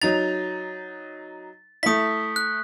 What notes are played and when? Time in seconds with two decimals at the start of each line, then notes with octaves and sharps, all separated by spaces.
0.02 F#3 D#4 A6 F7
1.83 A3 E4 D#6 B6
2.36 F#6